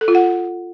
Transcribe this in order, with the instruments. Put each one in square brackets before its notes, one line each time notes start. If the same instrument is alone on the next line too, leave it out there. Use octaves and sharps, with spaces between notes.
[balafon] A4
F4
F#5